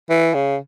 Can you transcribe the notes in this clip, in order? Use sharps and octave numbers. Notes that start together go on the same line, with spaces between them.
E3
C#3